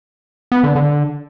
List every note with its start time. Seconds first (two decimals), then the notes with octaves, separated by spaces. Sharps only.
0.52 B3
0.64 D3
0.75 D3